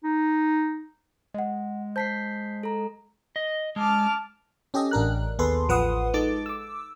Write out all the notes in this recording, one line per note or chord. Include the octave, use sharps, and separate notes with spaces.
D#4
G#3 D#5 F#5
C5 A5 G6 B6 C7
A4 A#5
D#5
G#3 A5 D6 F6
C#4 G4 A4 D#5
A1 D4 A#4 F#6
D#2 B3 G#4 A4 B4 C6
A1 F3 B4 F#5 C6 D#6
G#3 D#4 A4 D6 A6
D6 E6